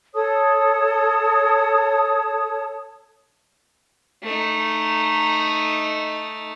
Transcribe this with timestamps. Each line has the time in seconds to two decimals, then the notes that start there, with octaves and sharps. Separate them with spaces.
0.15 A4 C#5 A5 D#6
4.23 A3 D#4